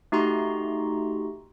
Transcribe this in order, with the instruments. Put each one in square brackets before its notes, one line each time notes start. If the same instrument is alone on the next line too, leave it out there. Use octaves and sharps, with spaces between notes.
[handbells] A3 D#4 F#4 G4 A#5 C6